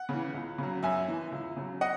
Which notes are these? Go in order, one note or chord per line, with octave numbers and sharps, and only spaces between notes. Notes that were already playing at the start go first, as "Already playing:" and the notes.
Already playing: F#5
C#3 E3
C#2
C#3 F#3
F#2 E5 G#5
E3
C#2
C#3 F#3
D#5 F#5